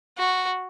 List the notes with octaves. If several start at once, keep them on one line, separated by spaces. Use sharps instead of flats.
F#4